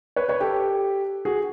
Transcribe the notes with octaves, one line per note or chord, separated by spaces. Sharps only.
B4 C#5
B4 C#5
G4 A4
F#4 G#4